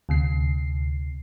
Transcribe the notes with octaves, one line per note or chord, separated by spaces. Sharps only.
D2 C3 C7